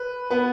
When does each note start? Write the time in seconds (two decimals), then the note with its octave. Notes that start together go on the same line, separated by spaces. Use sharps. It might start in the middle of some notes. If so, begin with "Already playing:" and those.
Already playing: B4
0.31 B3 B4